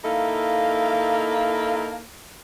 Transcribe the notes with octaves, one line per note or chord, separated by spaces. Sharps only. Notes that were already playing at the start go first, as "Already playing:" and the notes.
A#3 D#4 E4 A4 F5